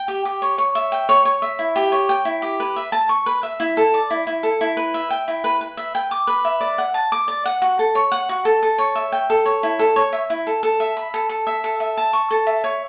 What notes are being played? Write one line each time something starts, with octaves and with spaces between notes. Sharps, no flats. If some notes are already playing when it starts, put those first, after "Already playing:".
Already playing: G5
G4
G4
C#5
C#5
E5
G5
C#5
C#5
E5
E4
G4
C#5
G5
E4
G4
B4
E5
A5
C#6
B4
E5
E4
A4
D5
E4
E4
A4
E4
B4
E5
G5
E4
B4
B4
E5
G5
D6
B4
E5
D5
F#5
A5
D6
D5
F#5
F#4
A4
C#5
F#5
F#4
A4
A4
C#5
E5
G5
A4
C#5
E4
A4
C#5
E5
E4
A4
A4
E5
B5
A4
A4
E5
A4
E5
A5
C#6
A4
E5
C#5